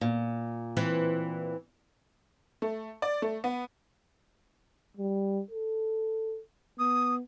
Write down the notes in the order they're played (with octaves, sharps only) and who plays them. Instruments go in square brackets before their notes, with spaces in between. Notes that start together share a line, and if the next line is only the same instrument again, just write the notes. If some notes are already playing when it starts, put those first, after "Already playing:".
[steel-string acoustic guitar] A#2
[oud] E3 C4
[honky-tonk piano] A3
D5
A3
B3
[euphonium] G3
A4
[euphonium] B3 [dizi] D#6